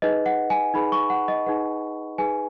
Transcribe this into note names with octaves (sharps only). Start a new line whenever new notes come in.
D#4 G#4 B4 D#5
F#5
G#5
D#4 G#4 B4 B5
C#6
F#5
D#5
D#4 G#4 B4 F#5
D#4 G#4 B4 G#5